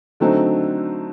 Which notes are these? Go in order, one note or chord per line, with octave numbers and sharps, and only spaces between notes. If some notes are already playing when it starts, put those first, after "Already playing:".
D3 F#3 A3 C4 D#4